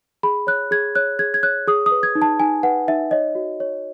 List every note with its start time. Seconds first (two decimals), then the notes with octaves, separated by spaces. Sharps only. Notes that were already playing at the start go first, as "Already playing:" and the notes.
0.23 G#4 B5
0.47 C#5 F#6
0.71 G#4 G#6
0.95 C#5 F#6
1.19 G#4 G#6
1.34 G#6
1.43 C#5 F#6
1.67 G#4 D#6
1.86 D#6
1.91 B4
2.03 G#6
2.15 D#4
2.22 A5
2.40 D#4 G#5
2.63 B4 F#5
2.88 D#4 E5
3.11 C#5 D#5
3.35 F#4
3.60 C#5